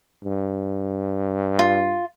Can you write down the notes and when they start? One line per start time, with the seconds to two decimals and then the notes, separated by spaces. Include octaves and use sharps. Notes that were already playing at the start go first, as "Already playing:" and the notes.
0.24 G2
1.59 F4